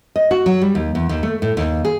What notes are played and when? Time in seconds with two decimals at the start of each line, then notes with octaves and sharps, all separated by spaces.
0.16 D#5
0.31 F#4
0.46 F#3
0.62 G3
0.75 D#2
0.95 E2
1.09 D#2
1.23 A3
1.42 A2
1.57 D#2
1.85 G#4